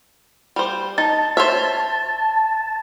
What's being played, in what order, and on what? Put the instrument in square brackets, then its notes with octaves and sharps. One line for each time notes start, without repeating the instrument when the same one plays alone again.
[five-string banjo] G3 C5
[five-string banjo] D#4 [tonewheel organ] A5
[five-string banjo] C5 C#5 E5